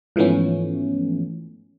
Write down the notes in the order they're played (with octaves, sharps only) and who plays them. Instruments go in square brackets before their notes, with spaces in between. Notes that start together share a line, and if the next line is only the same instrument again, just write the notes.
[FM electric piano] G#2 E3 F3 A3 B3 C#4